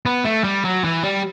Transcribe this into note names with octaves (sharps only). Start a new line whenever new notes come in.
B3
A3
G3
F#3
E3
G3